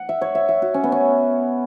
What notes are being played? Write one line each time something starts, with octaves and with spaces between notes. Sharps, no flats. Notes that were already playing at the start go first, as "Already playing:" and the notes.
Already playing: F#5
E5
C#5
E5
E5
F#4
C#4
B3
C#4